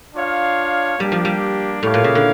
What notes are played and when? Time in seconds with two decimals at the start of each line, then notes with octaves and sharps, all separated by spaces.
0.15 D4 F4 C#5 F5
0.99 G3 A#3 D4 G4
1.12 F3
1.25 G3
1.83 A2 A#3 E4 G4 C#5 F5
1.94 A#2
2.04 C#3
2.15 D3